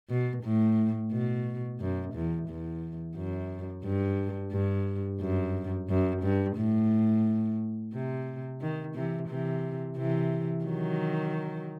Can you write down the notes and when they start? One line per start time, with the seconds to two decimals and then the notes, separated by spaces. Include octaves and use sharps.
0.09 B2
0.43 A2
1.11 B2
1.80 F#2
2.14 E2
2.48 E2
3.16 F#2
3.84 G2
4.52 G2
5.20 F#2
5.89 F#2
6.22 G2
6.57 A2
7.93 C3
8.61 D#3
8.95 C3 E3
9.29 C3 E3
9.97 C3 E3
10.65 D#3 F#3